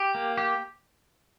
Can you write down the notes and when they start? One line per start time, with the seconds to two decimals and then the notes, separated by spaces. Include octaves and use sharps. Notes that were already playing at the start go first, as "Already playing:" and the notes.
Already playing: G4
0.15 A#3
0.38 G4